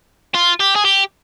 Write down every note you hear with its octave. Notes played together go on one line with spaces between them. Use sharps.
F4
G4
G#4
G4